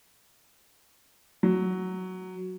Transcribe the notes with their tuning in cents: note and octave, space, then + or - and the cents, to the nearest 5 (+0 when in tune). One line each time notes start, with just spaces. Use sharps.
F#3 +0